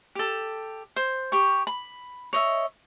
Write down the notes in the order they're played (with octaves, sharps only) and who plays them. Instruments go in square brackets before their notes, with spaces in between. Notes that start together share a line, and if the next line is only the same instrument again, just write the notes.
[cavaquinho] G4 A4
C5
G4 C#6
B5
C#5 D#5 E5